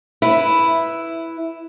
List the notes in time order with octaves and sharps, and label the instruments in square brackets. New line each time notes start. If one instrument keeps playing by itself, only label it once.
[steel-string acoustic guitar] E4 B4